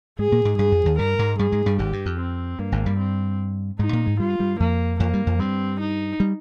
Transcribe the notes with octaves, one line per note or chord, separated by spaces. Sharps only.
G#2 G#3 G#4
A#2 A#3
G#2 G#3
G2 G3 G#4
F2 F3
D#2 D#3
G2 G3 A#4
G#2 G#3
G2 G3 G#4
G#2 G#3
G2 G3
G#1 G#2 G4
G2
F2
C4
G2 A#3
G#1 G#2
G2 G3
C4
G#2 G#3 D#4
A#2 A#3
G#2 G#3
G2 G3 F4
G2 G3
F2 F3 A#3
F2 F3 A#3
G2 G3
F2 F3
G2 G3 C4
D#4
G3